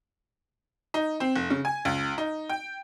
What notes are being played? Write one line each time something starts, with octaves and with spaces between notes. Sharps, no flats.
D#4
C4
F1
C#3
G#5
C#2
D#4
G5